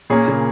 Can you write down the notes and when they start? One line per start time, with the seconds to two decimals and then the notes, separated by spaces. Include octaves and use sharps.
0.10 A#2 A#3 C#4 G#4
0.27 A#2 C#3